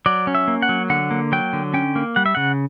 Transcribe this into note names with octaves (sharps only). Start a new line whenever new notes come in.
F#3 D5
C#4
E5
A#3
F#5
F#3
D3 F#5
A#3
F#3 G5
D3
C#4 G5
A#3
G3 F#5
E5
C#3 F#5